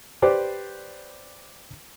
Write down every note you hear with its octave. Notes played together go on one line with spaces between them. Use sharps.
G4 B4 C5 D5 G5 D6